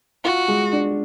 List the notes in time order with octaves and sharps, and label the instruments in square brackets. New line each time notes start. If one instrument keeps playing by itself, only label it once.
[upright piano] F4 [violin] F#4
[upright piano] G#3
D4